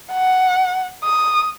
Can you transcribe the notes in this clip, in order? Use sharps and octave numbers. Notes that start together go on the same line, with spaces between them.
F#5
D#6